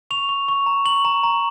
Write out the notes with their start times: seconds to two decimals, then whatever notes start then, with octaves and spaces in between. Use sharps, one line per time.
0.11 C#6 F7
0.29 C#6
0.48 C#6
0.66 A#5
0.85 C#6 F#7
1.05 A#5
1.23 A#5